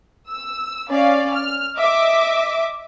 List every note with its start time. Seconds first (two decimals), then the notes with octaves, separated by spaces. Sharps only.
0.28 E6
0.89 C#4 D5 F5
1.34 F6
1.77 D#5 E5 D6